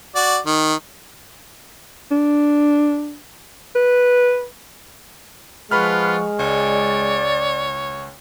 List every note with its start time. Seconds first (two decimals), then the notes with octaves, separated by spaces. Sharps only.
0.15 F#4 D5
0.46 D#3
2.11 D4
3.75 B4
5.71 F3 G#3 F4 B4 F#5 B5 C#6 F6
6.39 C#2 C#5 D5